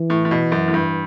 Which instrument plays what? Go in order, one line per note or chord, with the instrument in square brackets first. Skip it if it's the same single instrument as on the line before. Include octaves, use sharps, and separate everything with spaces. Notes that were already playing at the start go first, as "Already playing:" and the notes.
Already playing: [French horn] E3
[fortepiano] A2
A2
B2
F#2
A2
G2